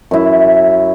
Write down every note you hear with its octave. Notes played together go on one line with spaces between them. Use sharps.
F#2 E4